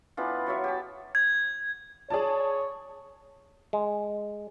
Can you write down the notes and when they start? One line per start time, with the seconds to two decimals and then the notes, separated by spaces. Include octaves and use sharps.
0.17 E3 B3 D4 F4
0.47 F#3 C#5 E5
0.64 G4 A5
1.15 G#6
2.10 G#4 C#5 D5 A5
3.73 G#3